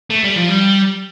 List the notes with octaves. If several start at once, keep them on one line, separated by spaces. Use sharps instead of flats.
A3
G3
F3
G3